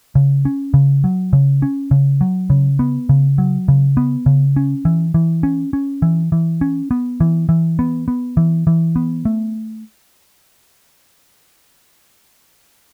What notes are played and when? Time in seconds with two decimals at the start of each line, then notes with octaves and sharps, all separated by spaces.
0.15 C#3
0.45 C#4
0.74 C#3
1.04 F#3
1.33 C#3
1.62 C#4
1.91 C#3
2.21 F#3
2.50 C#3
2.79 B3
3.09 C#3
3.38 F#3
3.68 C#3
3.97 B3
4.26 C#3
4.56 C#4
4.85 E3
5.14 E3
5.43 C#4
5.73 C#4
6.02 E3
6.32 E3
6.61 C#4
6.91 B3
7.20 E3
7.49 E3
7.79 B3
8.08 B3
8.37 E3
8.67 E3
8.96 B3
9.25 A3